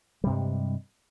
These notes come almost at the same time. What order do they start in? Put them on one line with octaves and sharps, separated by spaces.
G3 C3 G2 G#3